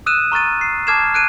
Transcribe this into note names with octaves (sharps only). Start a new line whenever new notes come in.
D#6 E6 F#6 D#7 E7
A#5 C#6 F6 A6 D#7
C7
A5 D6 F6 G#6 C7 E7
F#6 D7 D#7